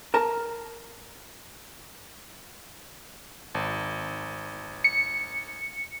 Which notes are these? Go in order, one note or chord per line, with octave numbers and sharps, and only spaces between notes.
A#4 A5 A#5
G#1
C#7